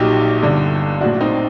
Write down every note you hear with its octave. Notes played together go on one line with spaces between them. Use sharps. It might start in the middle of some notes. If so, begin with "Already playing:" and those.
Already playing: A#1 A#2 F#3 D#4 G4
G1 G2 D3
A#1 A2 F#3 D4 F#4
C4 D#4